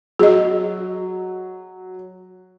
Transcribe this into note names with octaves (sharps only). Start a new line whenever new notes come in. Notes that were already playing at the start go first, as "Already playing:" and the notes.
F#3 G#4 D#5